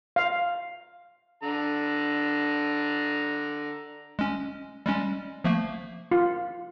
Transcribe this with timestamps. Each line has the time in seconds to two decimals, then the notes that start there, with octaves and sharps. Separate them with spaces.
0.16 F5
1.43 D3 D4 A#5
4.19 G#3 C#4
4.86 G3 G#3 C#4
5.44 F3 A3 A#3
6.11 F4